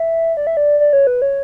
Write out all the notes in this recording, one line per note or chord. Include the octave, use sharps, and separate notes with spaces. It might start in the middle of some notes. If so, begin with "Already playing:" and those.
Already playing: E5
D5
E5
D5
D5
C#5
B4
C#5